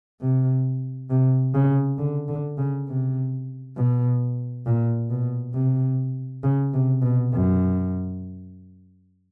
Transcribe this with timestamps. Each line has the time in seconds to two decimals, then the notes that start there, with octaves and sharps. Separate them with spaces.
0.21 C3
1.10 C3
1.54 C#3
1.98 D3
2.29 D3
2.58 C#3
2.88 C3
3.77 B2
4.66 A#2
5.10 B2
5.54 C3
6.44 C#3
6.74 C3
7.02 B2
7.33 F#2